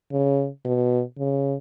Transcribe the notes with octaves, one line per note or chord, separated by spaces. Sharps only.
C#3
B2
C#3